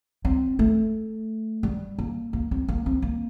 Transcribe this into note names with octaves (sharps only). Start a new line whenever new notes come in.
C4
A3
G3
A#3
A#3
C4
A#3
C4
A#3